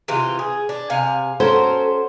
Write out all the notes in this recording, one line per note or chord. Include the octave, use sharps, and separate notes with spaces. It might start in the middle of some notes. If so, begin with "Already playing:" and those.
C3 E3 F4
G#4
D4
C3 F5 G#5
C#4 F#4 A4 A#4 C5